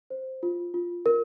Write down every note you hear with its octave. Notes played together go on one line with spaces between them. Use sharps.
C5
F4
F4
A#4